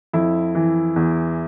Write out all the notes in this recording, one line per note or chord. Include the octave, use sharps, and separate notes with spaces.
F2 E4
E3
E2